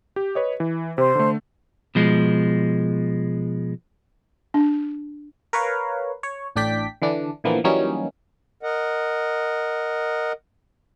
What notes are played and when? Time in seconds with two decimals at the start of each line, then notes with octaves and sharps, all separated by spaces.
0.16 G4
0.35 B4 C#5 D#5
0.60 E3
0.98 C3 C5
1.15 D3 A3
1.95 B2 F3 G#3
4.54 D4
5.53 A#4 B4 C#5 F5
6.23 C#5
6.56 A1 A2 D4 D5 G5 B6
7.02 D3 E3 D4
7.44 A#2 D3 E3 F3 A#3 B3
7.64 E3 F#3 G3 A#3 C#4 D#4
8.63 A#4 D#5 F#5